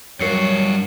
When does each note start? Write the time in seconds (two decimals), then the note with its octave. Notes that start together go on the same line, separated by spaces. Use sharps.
0.20 G2 F#3 F#4 A#4 C#5 C7 C#7